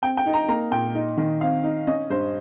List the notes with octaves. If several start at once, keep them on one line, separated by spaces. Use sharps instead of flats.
C4 G5
G5
D#4
A#5
A#3 A#5
A#2 G5
D#4
D#3
C4 F5
D#4
C#4 D#5
G2 C5